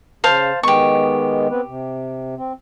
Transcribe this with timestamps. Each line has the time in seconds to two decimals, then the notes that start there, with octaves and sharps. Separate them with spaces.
0.24 C#3 C5 F5 A5
0.63 D#3 G#3 B3 G4 C#6
1.51 B3 C4 B4
1.67 C3
2.38 C4